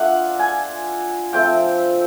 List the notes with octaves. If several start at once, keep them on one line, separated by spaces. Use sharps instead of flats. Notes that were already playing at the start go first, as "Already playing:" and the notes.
Already playing: A3 D4 F4 F#5
G#5
F3 A3 C4 G5